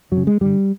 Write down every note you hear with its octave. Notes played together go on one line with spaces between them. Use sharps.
F#2 F#3
C#3
G#3
G2 D3 G3